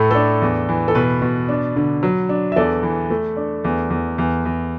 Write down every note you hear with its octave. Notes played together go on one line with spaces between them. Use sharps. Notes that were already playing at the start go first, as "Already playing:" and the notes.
Already playing: A2 A3 A4
D4 A4
E2
E3
A4
B2 B4
B2
D4
D3
F#3
D4
E5
E2 A4 D5
E3
A3
D4
E2
E2
E2
E2